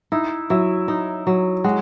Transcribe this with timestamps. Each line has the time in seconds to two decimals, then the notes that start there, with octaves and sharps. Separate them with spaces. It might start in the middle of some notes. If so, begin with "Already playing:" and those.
0.12 D#4 E4
0.50 F#3 E4
0.88 D#4
1.27 F#3
1.64 G#3 F#4